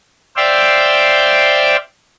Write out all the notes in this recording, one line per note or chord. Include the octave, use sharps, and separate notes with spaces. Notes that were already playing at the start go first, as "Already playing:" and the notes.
C5 D5 E5 F5 G5